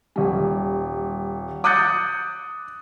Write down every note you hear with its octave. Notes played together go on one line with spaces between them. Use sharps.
D#1 G3
D6 D#6 F#6 G6 A6 C#7